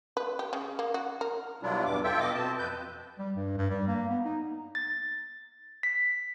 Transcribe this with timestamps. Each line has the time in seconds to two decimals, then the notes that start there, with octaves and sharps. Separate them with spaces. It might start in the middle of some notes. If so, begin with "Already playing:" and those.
0.17 B4
0.39 G4
0.53 C#3
0.79 A#3
0.94 F#4
1.21 A#4
1.63 B2 F#3 G3 D4 E4 F4
1.85 E2 G2 B2 D6
2.03 F4 A4 E5 G5
2.20 B2 D#5 D6
2.34 B2 C4 A5
2.58 F2 B4 G6
3.18 G3
3.35 G2
3.58 G2
3.70 G3
3.88 A#3
4.09 B3
4.25 D#4
4.75 A6
5.83 B6